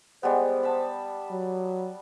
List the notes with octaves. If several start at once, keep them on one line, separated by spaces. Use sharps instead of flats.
G3 G#3 B3 C5
A5 B5
F#3